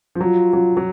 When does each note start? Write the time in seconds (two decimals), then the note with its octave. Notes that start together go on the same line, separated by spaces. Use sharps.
0.15 F3
0.20 F#3 F4
0.53 F#3
0.77 F#3